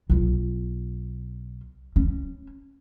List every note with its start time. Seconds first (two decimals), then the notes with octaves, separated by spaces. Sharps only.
0.10 B1 F4
1.96 C#4